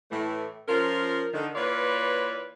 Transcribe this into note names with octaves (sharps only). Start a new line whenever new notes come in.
A2 E3 A3
F3 C#4 F4 A#4
D3 D#3
E3 A#3 F4 B4 C#5 D5